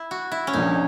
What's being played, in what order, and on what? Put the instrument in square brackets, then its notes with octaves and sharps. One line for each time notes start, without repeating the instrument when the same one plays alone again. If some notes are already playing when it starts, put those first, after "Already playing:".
Already playing: [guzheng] E4
F#4
E4
C#4
[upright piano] A#1 A#2 A#3 [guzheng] D#4